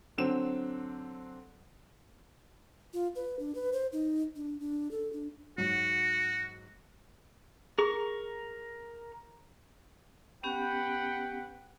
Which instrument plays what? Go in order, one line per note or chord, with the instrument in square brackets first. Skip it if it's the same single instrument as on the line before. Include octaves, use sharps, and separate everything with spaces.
[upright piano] D3 F#3 C4 E7
[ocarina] F4
B4
D4
B4
C5
D#4
D4
D4
A4
D4
[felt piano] G#2 F#3 [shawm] F#4
[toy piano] G#4 [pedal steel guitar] A#4 C#6
[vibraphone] B3 C#4 G4 [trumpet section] B4 F#5 G5